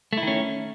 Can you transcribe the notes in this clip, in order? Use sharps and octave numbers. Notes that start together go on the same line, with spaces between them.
D#3 A3 C#4 E4